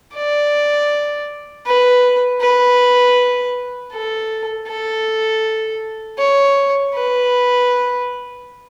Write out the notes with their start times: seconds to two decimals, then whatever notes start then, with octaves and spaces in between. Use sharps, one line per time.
0.15 D5
1.66 B4
2.41 B4
3.93 A4
4.68 A4
6.19 C#5
6.95 B4